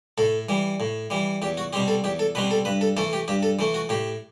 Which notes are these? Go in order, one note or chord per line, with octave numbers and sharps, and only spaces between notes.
A2 A4
E3 G3
A2
E3 G3
E2 G4
F#4
B2 G3 C4 G4
A4
E2 G4
A4
B2 G3 C4 B4
A4
G2 B4
A4
E3 A3 A4
G4
G2 G4
A4
E3 A3
F#4
A2 G4